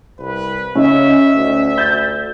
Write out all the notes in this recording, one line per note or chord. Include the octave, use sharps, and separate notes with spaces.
C2 B4
C#3 C#4 D#4 E5
D2
G6 A6